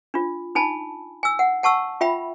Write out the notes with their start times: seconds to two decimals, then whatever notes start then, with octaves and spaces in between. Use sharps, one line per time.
0.14 D4 F4
0.55 D#4 G#5 A5 B5
1.23 G#5 E6
1.39 F#5
1.63 F#5 A5 C#6 E6
2.01 F4 E5 G5 B5